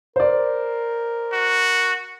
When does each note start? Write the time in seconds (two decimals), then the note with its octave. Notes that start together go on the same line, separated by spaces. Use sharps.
0.16 A#4 C5 D5
1.33 F#4